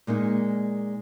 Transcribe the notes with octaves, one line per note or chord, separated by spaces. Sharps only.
A#2 G#3 A#3 D#4